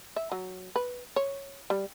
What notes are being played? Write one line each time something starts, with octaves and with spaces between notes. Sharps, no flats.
E5
F#3
B4
C#5
G3